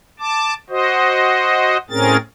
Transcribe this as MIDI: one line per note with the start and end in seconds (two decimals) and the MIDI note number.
0.20 0.54 81
0.20 0.54 86
0.70 1.77 66
0.70 1.77 72
0.70 1.77 75
1.90 2.17 45
1.90 2.17 60
1.90 2.17 61
1.90 2.17 68
1.90 2.17 70
1.90 2.17 93